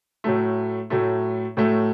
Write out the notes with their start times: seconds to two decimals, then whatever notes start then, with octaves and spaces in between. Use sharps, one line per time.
0.24 A2 F#3 A3
0.90 A2 F#3 A3
1.57 A2 F#3 A3